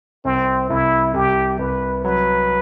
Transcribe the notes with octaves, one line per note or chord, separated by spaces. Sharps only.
C2 C4
C2 E4
C2 G4
C2 B4
F#3 B4